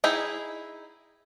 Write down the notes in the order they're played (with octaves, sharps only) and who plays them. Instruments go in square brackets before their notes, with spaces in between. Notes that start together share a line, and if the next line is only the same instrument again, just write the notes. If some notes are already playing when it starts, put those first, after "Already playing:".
[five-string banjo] D#4 E4 G#4 G5